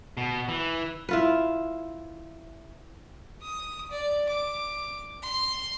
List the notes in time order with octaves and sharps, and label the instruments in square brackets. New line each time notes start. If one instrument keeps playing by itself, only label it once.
[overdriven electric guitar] B2
E3
[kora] E4 F4 B4
[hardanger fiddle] D#6
D5
D6
C6